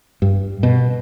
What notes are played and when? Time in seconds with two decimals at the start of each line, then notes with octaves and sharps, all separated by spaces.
0.22 G2
0.63 B2